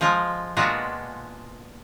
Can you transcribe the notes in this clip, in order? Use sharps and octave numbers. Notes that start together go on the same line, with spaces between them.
F3 G#3 F4
A#2 G#3 B3 D4 F4 F#4